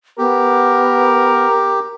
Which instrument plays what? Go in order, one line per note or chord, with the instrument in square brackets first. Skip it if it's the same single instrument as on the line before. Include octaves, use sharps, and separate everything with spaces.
[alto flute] B3 [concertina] G4 [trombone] A#4